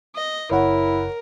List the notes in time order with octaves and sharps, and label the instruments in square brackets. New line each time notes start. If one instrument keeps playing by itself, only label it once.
[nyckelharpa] D#5
[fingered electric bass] F#1 [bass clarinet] E4 [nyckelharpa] A#4 [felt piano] C#5 F#5